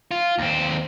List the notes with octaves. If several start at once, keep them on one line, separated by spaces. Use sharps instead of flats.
F4
D#2 C4